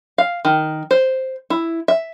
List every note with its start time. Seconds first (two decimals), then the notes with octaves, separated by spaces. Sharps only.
0.18 F5
0.45 D#3
0.91 C5
1.50 E4
1.88 E5